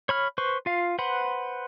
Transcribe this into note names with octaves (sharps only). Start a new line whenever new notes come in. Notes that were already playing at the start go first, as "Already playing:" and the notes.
C#5 B5 F6
B4 C5 C#6
F4 F5
B4 C5 F#5 B5 C6